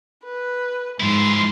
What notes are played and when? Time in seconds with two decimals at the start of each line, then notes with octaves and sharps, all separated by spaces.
0.24 B4
1.00 G#2 F3 E4 C6